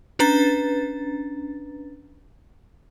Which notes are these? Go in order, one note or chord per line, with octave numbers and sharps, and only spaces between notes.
C#4 D4 B4 A#5 A6